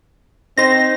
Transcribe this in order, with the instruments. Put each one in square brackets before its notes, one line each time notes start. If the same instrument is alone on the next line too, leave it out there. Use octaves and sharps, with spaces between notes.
[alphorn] C4 [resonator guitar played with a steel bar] D#4 C5 [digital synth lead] A#6